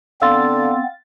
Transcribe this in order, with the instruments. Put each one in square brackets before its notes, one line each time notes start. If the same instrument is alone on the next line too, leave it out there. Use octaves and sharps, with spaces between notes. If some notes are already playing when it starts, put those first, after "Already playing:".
[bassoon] D3 [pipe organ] B3 C4 [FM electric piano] F5 A6 [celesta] C6 E6